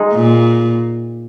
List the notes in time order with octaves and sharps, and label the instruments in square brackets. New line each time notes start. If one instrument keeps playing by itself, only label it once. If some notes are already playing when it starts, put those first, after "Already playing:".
Already playing: [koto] G#3 D#4
[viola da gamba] A#2